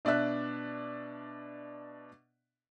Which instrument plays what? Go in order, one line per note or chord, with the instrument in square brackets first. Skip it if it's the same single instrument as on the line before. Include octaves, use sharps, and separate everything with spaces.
[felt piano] B2 D4 D5 E5 F#6